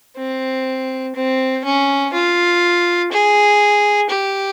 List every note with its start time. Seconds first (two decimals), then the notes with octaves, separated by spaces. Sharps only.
0.17 C4
1.15 C4
1.64 C#4
2.13 F4
3.11 G#4
4.09 G4